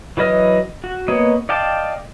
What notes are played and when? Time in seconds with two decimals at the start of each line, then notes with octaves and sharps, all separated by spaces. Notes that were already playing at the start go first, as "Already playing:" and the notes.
0.17 E3 F#3 B4 D#5 F6
0.84 F#4
1.08 A#3 B3 C#5 D#5
1.49 D5 D#5 F5 G5 A5